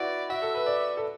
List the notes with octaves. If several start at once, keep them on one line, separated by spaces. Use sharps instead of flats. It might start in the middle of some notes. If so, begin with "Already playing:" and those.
Already playing: E4 F#4 B4 D5
F#4 E5
A4
B4
D5
A4